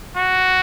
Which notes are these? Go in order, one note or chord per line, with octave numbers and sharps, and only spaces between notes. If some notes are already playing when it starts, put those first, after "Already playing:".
F#4